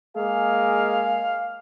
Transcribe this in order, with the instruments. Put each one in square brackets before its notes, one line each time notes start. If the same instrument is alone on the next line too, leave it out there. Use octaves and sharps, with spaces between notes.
[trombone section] G#3 A#3 G#4 [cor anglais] F5